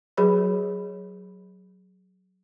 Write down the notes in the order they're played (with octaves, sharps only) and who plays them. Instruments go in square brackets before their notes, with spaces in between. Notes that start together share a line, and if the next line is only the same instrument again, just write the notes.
[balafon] F#3 F#4 G#4 B4 C#5 B5